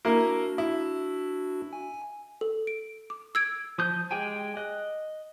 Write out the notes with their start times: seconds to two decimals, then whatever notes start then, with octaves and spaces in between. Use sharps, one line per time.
0.05 A#3 D4 E4 F#4 A#4
0.58 E4
1.73 G#5
2.41 A4
2.67 D7
3.10 D6
3.35 E6 G#6 D7
3.78 F3 D#6 G6
4.11 G#3 G4 G5 G#5
4.57 D#5 F#6